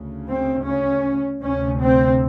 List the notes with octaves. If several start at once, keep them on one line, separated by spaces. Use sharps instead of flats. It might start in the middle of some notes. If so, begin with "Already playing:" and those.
Already playing: D2 C#3
C4
C#4
D2 C3 C#4
C4